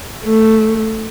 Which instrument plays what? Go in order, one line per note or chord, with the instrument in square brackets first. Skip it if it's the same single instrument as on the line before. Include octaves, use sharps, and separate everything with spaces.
[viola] A3